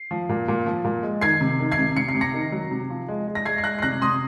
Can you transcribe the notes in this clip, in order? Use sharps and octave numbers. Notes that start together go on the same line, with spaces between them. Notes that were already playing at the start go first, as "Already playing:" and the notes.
Already playing: C7
F3
A#2
A#2
F3
A#2
G#3
D#3 G#6 C7
C3
D#3
G#6 C7
C3
C3 C#7
C7
C3
A#6 C#7
D#3
F#3
C3
F3
G#3
G#3
A#6
G#3 G#6 C7
C7
G#3 F#6 A#6
C7
C3 F#6 A#6
C3 C6 D#6